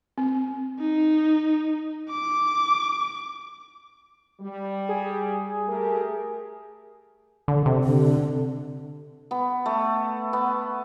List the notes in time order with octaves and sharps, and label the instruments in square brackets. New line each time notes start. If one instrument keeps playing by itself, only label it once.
[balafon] C4
[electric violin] D#4
D6
[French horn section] G3
[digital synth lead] G#4
[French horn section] A3 G4 A#4
[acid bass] D3
C3
[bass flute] D3
[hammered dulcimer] B3
A3
B3